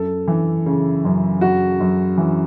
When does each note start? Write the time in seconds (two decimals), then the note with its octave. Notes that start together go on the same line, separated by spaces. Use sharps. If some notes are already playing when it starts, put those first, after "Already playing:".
Already playing: F#2 A4
0.28 E3
0.66 C#3
1.04 F#2
1.41 F#2 F#4
1.80 F#2
2.18 E3